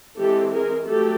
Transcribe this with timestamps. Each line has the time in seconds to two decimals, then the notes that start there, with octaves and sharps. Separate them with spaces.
0.18 E3 G#3 C4 G4 A4
0.52 G#4 A#4
0.85 F#3 A3 G4 A4